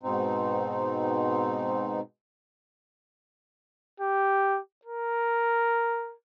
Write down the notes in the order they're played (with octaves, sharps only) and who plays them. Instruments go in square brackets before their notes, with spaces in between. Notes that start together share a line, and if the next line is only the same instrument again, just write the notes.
[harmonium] G#2 B2 C4 D#4
[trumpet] G4
A#4